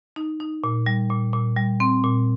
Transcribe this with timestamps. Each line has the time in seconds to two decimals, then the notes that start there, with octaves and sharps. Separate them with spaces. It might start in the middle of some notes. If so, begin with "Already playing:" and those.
0.16 D#4
0.40 D#4
0.64 A#2
0.86 G3
1.10 A#2
1.33 A#2
1.57 G3
1.80 C4
2.04 A#2